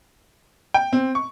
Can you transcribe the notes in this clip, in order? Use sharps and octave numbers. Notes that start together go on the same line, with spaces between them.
G5
C4
C#6